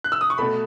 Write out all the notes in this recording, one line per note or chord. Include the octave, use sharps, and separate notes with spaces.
F#6
E6
D#6
C#6
B2 A3 B5